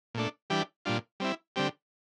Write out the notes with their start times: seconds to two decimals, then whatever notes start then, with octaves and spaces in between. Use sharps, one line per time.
0.15 A#2 A3 D4
0.50 E3 G3 D4 G4
0.85 A#2 G3 D4 F4
1.20 G3 C4 E4
1.56 D3 G3 C4 G4